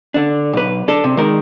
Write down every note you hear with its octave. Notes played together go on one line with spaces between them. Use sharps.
D3 D4
B1 B4
D4 A4
C3
D#3 G#3 A#4